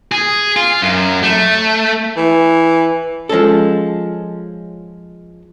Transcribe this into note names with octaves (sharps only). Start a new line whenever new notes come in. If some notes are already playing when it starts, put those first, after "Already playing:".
G#4
F4
F#2
A3
E3
F3 G#3 C#4 A4